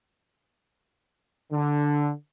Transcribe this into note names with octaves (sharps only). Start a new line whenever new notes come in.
D3